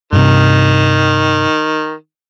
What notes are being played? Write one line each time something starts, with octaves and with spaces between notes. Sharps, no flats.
G2 C3 D#3